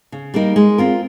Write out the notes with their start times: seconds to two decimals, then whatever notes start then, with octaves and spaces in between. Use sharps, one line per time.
0.12 C#3
0.34 G3 A#3 D#4 A#4
0.56 G#3
0.78 C4 F4 A#4